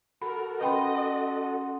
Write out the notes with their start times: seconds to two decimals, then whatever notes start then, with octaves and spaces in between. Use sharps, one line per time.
0.22 F#4 A4 A#4 B5
0.61 C#4 B4 D#5 F#5 G5 B5 C6